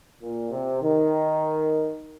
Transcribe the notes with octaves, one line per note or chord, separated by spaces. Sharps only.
A#2
C3
D#3